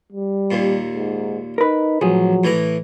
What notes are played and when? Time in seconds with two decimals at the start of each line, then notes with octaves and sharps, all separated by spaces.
0.12 G3
0.51 D#2 A#2
0.92 G#2
1.58 D#4 A#4 B4
2.01 A1 F3 F#3 G#4
2.44 A2 E3 A#5